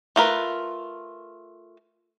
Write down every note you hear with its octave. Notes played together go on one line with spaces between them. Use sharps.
A3 F4 A#4 B4